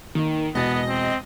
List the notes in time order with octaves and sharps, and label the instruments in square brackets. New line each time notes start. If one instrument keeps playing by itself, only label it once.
[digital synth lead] D#3 [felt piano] A#3 D#4
[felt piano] E1 B2 A6 [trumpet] B3 [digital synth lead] D#5
[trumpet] C4